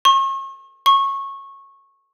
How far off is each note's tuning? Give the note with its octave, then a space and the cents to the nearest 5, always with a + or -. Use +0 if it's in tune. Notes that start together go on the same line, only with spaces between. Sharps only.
C#6 -40
C#6 -15